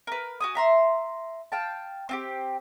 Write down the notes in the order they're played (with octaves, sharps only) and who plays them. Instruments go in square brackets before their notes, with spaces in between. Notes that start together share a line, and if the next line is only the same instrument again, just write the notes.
[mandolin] A#4 B4
F#4 G#5 D#6
E5 A#5 C6
F5 G5 A5
C4 F4 G4